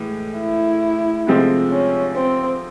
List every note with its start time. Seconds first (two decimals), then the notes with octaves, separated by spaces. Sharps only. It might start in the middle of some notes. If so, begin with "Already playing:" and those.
Already playing: A2 E3 G#3
0.39 E4
1.27 D2 C3 F3 G#3 C4
1.71 C#4
2.15 C4